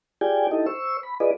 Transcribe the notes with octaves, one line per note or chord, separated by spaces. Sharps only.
F4 G4 G#4 D5 G5 G#5
D#4 E4 G4 A4 D#5
C5 C#6 E6
B5
F4 G#4 B4 D5 D#5